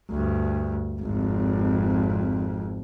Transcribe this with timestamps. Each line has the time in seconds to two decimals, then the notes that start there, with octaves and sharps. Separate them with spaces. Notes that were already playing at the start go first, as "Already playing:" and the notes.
0.10 D2 G2
1.01 G#1 F2